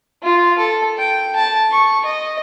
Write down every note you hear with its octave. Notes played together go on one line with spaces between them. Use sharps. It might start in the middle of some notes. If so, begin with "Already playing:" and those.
F4
A4
G5
A5
C#6
D#5